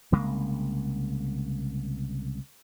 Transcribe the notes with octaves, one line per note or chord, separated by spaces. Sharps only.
C2 C#3 G#3 A#3